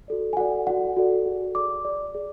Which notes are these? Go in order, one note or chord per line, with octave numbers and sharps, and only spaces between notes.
F#4 A4 D5
G#5
F#4 A4 D5 F#5
F#4 A4 D5 F#5
F#4 A4 D5
G#4 D5
G#4 D5 D6
G#4 D5
G#4 D5